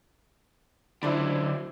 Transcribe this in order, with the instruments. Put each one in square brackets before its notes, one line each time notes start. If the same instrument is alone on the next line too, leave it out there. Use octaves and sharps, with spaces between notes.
[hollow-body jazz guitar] C#2 D4 B5 [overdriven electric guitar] D3 F#3 [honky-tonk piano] E4 C5 D5